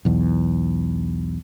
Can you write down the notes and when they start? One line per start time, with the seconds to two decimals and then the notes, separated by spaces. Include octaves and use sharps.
0.05 B1 E2